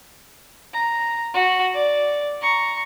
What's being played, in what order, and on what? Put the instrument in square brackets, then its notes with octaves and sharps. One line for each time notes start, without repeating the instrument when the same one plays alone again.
[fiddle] A#5
F#4
D5
A#5 C#6